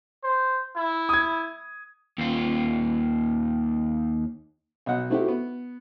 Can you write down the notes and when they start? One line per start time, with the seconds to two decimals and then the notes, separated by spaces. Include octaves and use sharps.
0.23 C5
0.76 E4
1.09 D#6 G#6
2.18 D#2 F4
4.86 B1 D#5 F#5
5.10 A3 C4 D#4 E4 F#4 G4
5.28 B3